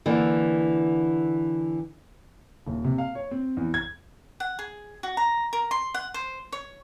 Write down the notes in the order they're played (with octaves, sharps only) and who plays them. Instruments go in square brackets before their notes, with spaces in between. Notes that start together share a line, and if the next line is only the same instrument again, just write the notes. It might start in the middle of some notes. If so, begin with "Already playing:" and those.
[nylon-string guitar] D3 E3 A#3
[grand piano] D#1
C3
F5
C#5
C4
E2
G#6
[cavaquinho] F#5
G#4
F#4
A#5
A#4
C6
F#5
C5
C#5